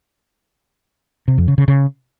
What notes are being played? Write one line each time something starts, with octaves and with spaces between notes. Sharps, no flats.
C3
F2
C#3
C#3
C#3